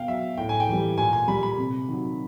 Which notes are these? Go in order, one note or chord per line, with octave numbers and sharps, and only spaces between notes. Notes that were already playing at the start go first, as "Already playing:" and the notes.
Already playing: B2 F5 G5
F#3 E5
A2 G5
G#5
G5
E3 G3
A#2 G#5
G#5
G3 B5
B5
C3
D#3 F#3